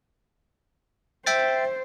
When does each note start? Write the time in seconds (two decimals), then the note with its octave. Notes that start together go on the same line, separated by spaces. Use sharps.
1.26 C5 E5 G5 A6